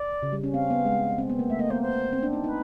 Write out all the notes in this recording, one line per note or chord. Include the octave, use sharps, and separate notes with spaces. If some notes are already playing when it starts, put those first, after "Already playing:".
Already playing: D5
C#3
G3
C#4
C4 F5
B3
G#3
C4
B3
A#3
A3 E5
A#3 D#5
B3 C5
C5
C4
D4
D#4
D#4 B4